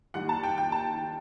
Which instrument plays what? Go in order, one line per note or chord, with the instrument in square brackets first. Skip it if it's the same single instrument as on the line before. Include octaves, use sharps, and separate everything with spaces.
[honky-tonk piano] D#2 D#3 G3 F#5
A5
G5
G5
A5